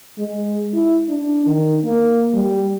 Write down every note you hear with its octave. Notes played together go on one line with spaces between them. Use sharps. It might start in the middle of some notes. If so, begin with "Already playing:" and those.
G#3
E4
D4
D#3
A#3
G3